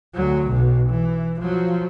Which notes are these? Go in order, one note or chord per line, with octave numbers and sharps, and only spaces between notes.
D2 F#3
B1 B2
E3
F3 F#3